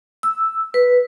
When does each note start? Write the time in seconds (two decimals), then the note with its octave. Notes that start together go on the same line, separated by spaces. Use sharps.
0.23 E6
0.74 B4